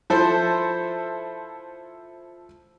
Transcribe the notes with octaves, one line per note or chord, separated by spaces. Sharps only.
F3 E4 A4 C5